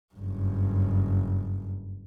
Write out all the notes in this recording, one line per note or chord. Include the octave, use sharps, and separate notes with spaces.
F#1 G2